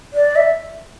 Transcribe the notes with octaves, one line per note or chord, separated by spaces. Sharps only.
D5
E5